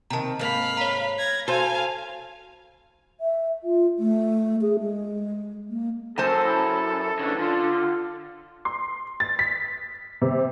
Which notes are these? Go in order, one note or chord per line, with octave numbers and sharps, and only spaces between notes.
C3 D#3 A5 A#5
G#2 A#3 F5 B5
C#5 A#5
G#6 A#6
F#4 A4 C5 F5 G#5
E5
F4
A3
G#4
G#3
A#3
F#2 A4 C5 G#5 A5
E4
C#3 E3 D4
D3 F4
C6
A6
B6
C3